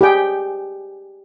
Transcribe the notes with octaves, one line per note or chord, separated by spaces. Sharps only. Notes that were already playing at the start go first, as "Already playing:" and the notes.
G4 G#4 G5